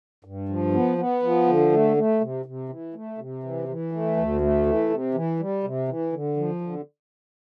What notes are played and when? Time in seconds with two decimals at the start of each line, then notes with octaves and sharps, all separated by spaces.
0.24 G2
0.49 F3
0.73 B3
0.98 B3
1.23 F3
1.47 D3
1.72 A3
1.97 A3
2.21 C3
2.46 C3
2.69 E3
2.94 A3
3.18 C3
3.43 E3
3.68 E3
3.92 A3
4.17 D2
4.41 A3
4.66 E3
4.90 C3
5.14 E3
5.39 G3
5.63 C3
5.88 E3
6.13 D3
6.37 F3
6.61 D3